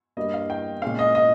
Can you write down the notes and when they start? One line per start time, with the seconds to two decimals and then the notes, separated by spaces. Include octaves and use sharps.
0.17 G2 G3 A#3 D#5
0.34 F5
0.50 G5
0.82 A#2 G#3 C#4 F5
0.99 D#5
1.15 D#5